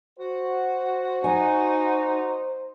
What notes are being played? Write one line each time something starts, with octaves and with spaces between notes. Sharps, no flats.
F#4 C5
D#4 G#5